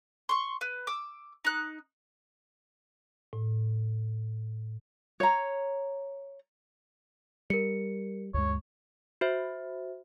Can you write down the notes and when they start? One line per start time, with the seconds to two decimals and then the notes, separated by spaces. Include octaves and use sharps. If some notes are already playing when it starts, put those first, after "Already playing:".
0.29 C6 C#6
0.61 B4
0.87 D6 E6
1.45 D#4 F#6
3.33 A2
5.20 C#5 A#5
7.50 G3 A#4 C#7
8.34 D2 G2 G#3 C#5
9.21 F#4 C5 E5